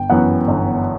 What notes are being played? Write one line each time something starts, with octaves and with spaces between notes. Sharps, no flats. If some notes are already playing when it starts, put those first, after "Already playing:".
Already playing: G1 G5
F#2 E3 B3 F#5
G1